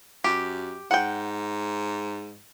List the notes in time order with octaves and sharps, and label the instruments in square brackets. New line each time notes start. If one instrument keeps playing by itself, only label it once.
[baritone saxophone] F#2 [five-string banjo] G4
[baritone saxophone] G#2 [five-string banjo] F#5 G5